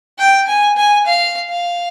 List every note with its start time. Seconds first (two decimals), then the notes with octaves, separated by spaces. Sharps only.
0.19 G5
0.47 G#5
0.77 G#5
1.06 F5
1.49 F5